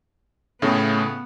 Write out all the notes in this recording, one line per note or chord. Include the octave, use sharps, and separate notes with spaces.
A2 C#3 A3 B3